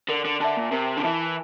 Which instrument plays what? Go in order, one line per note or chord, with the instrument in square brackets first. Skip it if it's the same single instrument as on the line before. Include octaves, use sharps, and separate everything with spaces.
[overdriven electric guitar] D3 [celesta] A#4
[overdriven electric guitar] D3
[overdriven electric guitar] D3 [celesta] E5 A5
[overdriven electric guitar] A#2
[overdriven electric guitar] C3 [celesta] A#4
[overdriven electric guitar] D3
[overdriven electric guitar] E3 [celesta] E5 A5